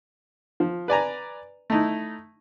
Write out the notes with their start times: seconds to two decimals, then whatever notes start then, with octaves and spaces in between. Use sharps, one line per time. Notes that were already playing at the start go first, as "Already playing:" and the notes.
0.60 F3
0.88 B4 D5 G#5 A#5
1.70 A3 D#4 E4